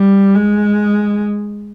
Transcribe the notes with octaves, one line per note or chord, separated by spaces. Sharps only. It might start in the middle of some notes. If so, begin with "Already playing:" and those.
Already playing: G3
G#3